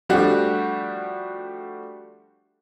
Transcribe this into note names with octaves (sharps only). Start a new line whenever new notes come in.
F3 G3 A3 D4 F#4 G4